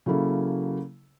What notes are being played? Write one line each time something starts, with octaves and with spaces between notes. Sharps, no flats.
C#3 F#3 A#3 E4 A4